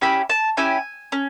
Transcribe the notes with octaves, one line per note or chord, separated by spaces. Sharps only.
C#4 E4 G4 B5
A5
C#4 E4 G4 G#5
C#4